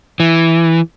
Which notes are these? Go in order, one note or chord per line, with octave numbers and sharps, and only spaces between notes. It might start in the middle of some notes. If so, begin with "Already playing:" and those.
E3